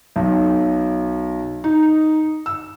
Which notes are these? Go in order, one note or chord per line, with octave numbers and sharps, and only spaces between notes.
B1
D#4
E6